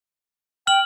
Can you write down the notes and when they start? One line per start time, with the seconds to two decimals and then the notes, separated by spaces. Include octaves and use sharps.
0.67 G5 F6 F#7